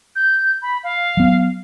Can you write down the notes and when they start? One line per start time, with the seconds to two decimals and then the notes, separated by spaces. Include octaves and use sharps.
0.16 G6
0.62 B5
0.83 F5
1.17 F#3 B3